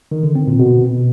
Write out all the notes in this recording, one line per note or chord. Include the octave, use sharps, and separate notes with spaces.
D#3
D3
C4
A#2
B2